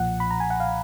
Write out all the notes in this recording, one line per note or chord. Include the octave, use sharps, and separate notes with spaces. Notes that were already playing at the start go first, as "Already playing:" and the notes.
Already playing: B1 A#2 F3 F#5
B5
A#5
G#5
F#5
F5